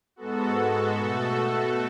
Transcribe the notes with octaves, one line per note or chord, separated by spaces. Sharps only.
G#2 G#3 B3 F#4 A4
B2 A3